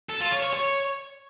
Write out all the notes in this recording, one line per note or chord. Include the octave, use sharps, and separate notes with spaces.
A4
F4
C#5
C#5
C#5